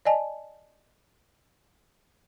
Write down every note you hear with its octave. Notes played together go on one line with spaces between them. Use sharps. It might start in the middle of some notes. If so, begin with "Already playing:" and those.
D5 D#5 G#5 A5